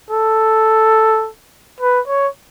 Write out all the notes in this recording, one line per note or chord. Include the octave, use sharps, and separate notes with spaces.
A4
B4
C#5